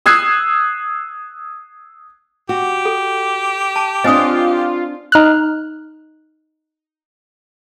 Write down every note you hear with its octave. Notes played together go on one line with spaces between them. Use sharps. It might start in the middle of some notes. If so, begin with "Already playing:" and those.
D#6 E6 F#6 G#6 C7
F#4 G4
A4
A5
C4 D4 F4 D#5 G#5 D#6
D#4 F6 F#6